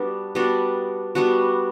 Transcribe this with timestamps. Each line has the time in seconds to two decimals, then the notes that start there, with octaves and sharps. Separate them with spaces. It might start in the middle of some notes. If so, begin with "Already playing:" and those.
Already playing: G3 B3 D4 F#4
0.35 G3 B3 D4 F#4
1.15 G3 B3 D4 F#4